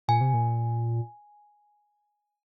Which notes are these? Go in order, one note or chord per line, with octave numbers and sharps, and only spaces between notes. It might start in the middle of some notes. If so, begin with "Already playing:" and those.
A#2 G#5
C3
A#2